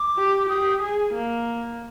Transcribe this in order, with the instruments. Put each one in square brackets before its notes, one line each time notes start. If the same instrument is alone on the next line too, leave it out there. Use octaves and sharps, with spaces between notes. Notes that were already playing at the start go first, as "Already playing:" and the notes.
Already playing: [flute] D6
[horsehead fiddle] G4
[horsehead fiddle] G4 [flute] D#6
[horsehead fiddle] G#4
A#3